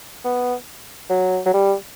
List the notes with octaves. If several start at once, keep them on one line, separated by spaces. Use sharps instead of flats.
B3
F#3
F#3
G3